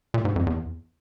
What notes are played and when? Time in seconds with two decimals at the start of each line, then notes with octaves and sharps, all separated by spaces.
0.14 A#2
0.25 G#2
0.36 F2
0.47 E2